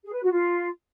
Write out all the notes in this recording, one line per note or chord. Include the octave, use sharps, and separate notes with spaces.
G#4
B4
F#4
F4